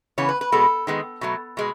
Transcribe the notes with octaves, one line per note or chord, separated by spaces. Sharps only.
C#3 E3 B3 C#5
B4
B4
B2 G#3 B3 A4
D#3 G#3 B3
B2 F#3 A3
B2 G#3